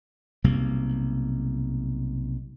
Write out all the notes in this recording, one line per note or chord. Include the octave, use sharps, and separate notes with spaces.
B1 C3 G3 A#3